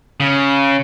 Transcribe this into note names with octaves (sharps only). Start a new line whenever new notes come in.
C#3